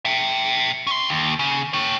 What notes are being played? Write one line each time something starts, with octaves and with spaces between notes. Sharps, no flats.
E5 G5
C#4 C6
D#2
C#3
C#5 G5